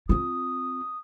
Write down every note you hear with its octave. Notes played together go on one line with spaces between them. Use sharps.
C4 F4 D#6